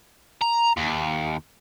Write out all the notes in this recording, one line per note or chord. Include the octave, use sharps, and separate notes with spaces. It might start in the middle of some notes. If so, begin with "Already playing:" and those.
A#5
D#2